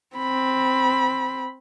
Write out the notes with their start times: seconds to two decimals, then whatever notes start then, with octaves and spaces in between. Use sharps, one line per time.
0.16 C4 B5